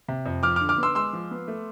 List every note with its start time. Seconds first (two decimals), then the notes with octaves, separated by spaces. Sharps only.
0.08 C3
0.26 F2
0.43 F3 D6 F6
0.56 D6 F6
0.61 D3
0.69 D6 F6
0.78 B3
0.83 C6 E6
0.95 G#3 C6 E6
1.13 F3
1.31 B3
1.48 A3